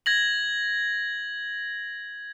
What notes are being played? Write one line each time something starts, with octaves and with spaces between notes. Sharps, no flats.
G#6 A#6 F#7